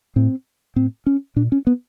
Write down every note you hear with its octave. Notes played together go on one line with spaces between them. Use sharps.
A2 C4
A2 C4
C#4
A#2 D4
C#4
B3